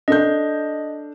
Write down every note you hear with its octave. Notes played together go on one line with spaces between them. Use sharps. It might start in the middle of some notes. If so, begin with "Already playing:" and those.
D4 A4 D#5 G6